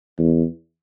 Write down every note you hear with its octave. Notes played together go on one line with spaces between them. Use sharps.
E2